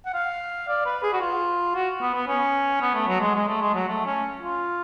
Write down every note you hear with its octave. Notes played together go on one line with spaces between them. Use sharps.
F#5
F5
D5
B4
G#4
F#4
F4
F#4
B3
B3
C#4
B3
A3
F#3
G#3
G#3
A3
G#3
F#3
A3
C#4
F4